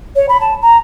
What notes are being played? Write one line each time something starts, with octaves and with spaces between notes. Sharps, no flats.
C#5
B5
A5
A#5